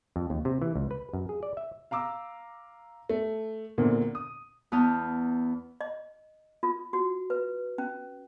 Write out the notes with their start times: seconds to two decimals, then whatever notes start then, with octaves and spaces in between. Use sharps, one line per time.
0.16 F2
0.30 D#2
0.45 C3
0.62 E3
0.76 C#2
0.91 B4
1.14 F#2
1.29 G#4
1.43 D5
1.57 E5
1.91 F5 A#5 D6 E6
3.09 A3
3.78 E2 A#2 D3 A#3 C4
4.15 D#6
4.72 E2 B3 A5 D#6 F6 G6
5.81 D#5
6.63 F4
6.93 F#4
7.30 B4
7.78 C#4